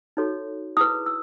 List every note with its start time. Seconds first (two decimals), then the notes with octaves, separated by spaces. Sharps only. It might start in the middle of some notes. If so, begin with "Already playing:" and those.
0.17 D#4 F#4 A4 C#5
0.77 E4 G#4 B4 D#6
1.06 E6